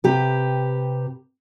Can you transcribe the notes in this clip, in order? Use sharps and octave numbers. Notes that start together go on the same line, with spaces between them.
C3 G4 B4